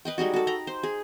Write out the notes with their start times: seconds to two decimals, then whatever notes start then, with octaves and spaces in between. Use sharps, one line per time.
0.05 B4 D#5 G5
0.18 G3 G#3 D#4 F#4
0.34 F#4 A4
0.47 G5 A#5 B5
0.67 C5
0.83 G#4